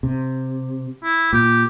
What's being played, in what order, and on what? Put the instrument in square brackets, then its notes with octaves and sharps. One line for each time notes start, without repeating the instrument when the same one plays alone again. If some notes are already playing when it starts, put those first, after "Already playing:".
[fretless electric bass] C3
[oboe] E4
[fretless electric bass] A#2 [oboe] G4